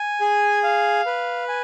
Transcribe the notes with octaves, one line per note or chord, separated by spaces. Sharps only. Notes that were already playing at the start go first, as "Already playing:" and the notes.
Already playing: G#5
G#4
F5
B4
G#5